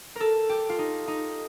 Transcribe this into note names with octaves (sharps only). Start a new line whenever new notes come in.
A4 A#4
G4
F4
D#4
D#4